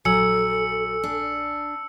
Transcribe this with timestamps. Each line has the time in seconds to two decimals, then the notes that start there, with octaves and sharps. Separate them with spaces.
0.05 A#1 F#3 A4 G#5 E6 C#7
1.03 D4